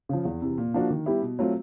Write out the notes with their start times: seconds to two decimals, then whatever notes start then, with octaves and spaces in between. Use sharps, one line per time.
0.09 C#3 F3
0.25 E2
0.42 C3 E3
0.58 A#2
0.74 F3 A#3 D4 F#4
0.90 D#3
1.06 G3 B3 E4 G4
1.22 B2
1.39 F#3 A3 C4 F4